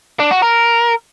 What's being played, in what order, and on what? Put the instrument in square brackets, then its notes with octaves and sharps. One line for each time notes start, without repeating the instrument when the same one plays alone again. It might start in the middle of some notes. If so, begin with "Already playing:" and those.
[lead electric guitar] D4
F#4
A#4